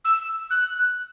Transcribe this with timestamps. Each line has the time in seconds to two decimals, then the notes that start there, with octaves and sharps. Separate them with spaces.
0.05 E6
0.50 F#6